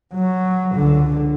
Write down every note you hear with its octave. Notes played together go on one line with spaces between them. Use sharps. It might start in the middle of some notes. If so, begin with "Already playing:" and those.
F#3
C#2 D3